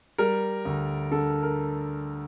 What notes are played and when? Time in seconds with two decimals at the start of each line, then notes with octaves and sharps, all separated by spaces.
0.18 G3 A#4
0.65 D2
1.11 D3 A4
1.43 A#4